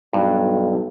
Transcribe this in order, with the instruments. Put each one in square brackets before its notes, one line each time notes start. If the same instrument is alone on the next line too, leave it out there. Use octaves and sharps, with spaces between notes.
[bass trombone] B1 [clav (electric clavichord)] G2